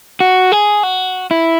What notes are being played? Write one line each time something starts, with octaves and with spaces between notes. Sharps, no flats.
F#4
G#4
F#4
E4